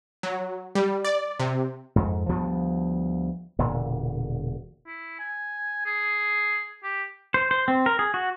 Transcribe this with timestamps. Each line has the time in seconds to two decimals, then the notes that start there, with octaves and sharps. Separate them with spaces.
0.23 F#3
0.75 G3
1.05 D5
1.40 C3
1.96 F2 G#2
2.29 D2 F3 G3 B3
3.59 E1 A#2 D3
4.86 E4
5.19 G#5
5.86 G#4
6.83 G4
7.34 C5
7.51 C5
7.68 C4
7.86 A#4
7.99 G#4
8.14 F#4